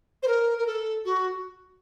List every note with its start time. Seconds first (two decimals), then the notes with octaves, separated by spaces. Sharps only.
0.23 C5
0.27 A#4
0.58 A#4
0.67 A4
1.05 F#4